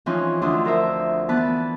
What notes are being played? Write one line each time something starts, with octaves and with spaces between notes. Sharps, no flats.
E3 F3 C4 C#4 D#4 F4
D2 D4 F4 E5 C6 D#6
F3 A#4 C5 E5
E3 B3 B4 A5 B5